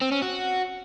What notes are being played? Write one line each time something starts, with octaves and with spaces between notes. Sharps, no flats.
C4
C#4
F#4